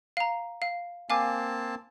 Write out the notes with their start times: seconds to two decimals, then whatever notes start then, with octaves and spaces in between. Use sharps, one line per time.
0.17 F5 A#5
0.62 F5
1.10 A#3 C4 F5 G#5 A5 D6